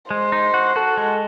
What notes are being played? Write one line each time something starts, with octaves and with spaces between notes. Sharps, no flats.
G#3 C5
D#4
F#4
F#4 A4
G#3